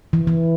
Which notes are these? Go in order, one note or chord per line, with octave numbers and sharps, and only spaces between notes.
E3
E3